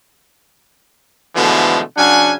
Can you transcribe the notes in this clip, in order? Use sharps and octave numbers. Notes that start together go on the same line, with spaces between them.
B2 D3 E3 F3 G#3 A3
C#3 F#3 D4 F#5 G#5